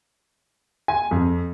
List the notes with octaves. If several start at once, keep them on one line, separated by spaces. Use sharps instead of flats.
G#5
F2